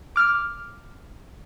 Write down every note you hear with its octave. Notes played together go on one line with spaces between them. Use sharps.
D6 F6